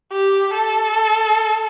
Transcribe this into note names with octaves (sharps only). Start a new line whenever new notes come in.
G4
A4